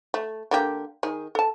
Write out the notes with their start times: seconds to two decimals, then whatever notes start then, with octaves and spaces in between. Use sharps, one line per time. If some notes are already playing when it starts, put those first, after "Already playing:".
0.14 A3
0.51 D3 A#3 G4
1.03 D#3 G#4
1.35 A4 A5